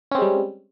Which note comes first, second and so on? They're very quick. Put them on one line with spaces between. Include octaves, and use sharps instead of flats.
C#4 C4 G#3 G3